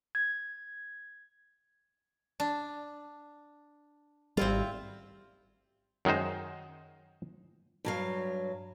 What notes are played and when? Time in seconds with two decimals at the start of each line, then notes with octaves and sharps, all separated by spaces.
0.15 G#6
2.40 D4
4.37 G#1 G3 C4 E4 F4
6.05 F#2 D#3 G#3 D#4 C5
7.85 G2 F#3 F5